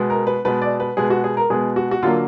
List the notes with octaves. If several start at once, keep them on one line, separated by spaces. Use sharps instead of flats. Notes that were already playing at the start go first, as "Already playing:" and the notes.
Already playing: B2 G#3 B3
A#4
B4
B2 G#3 B3 B4
D5
B4
B2 G#3 B3 G#4
F#4
G#4
A#4
B2 G#3 B3 G#4
F#4
F#4
D3 F#3 A#3 F4